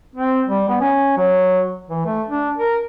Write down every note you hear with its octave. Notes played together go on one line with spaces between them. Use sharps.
C4
G3
B3
C#4
F#3
E3
A3
D4
A#4